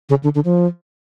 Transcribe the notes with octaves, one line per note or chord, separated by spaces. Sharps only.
C#3
D3
D3
F3